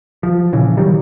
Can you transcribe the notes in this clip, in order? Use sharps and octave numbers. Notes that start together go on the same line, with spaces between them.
F3
A#2 C#3 E3
D#3 F#3 G3